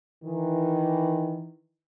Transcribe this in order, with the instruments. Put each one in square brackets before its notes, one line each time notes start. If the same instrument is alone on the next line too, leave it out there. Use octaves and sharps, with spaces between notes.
[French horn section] D#3 E3